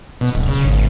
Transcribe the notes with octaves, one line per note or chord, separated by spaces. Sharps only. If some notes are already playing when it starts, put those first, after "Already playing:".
B2
D1
C#3
G#1